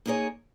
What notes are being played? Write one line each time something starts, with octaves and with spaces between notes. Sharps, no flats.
A#3 D#4 G#4 C#5